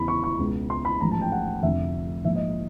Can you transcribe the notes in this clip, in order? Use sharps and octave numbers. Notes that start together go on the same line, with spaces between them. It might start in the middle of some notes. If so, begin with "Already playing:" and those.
Already playing: E2 C#3 E3 B5
C#6
C#6
C#2 B2
C6
B5
A1 G#2 F3 A#5
A5
G5
F#5
F1 F2 D3 F3 E5
A#1 G#2 F3 E5
D#5